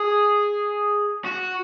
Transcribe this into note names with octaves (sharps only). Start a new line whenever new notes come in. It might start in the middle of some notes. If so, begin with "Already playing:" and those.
Already playing: G#4
F#4